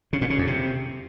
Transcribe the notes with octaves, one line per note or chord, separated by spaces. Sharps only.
C#3
A#2
C#3
F2
C3